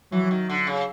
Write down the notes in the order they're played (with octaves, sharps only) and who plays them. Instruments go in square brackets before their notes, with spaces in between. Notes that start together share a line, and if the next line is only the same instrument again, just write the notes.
[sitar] E3 [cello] F#3
[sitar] D#3
D3
C#3